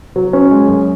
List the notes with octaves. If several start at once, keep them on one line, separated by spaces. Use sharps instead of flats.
F#3
C#4
G#3
F#2